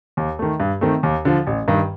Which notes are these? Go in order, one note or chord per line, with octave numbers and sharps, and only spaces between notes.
D#2
D#3 A3
G2
D#3 A3 C4
D#2
D3 F3
A1
G2 D#3